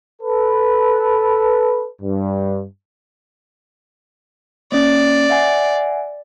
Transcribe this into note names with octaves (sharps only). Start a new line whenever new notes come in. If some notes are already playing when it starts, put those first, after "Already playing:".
A4 B4
G2
A#3 C#4 D5
E5 F#5 G#5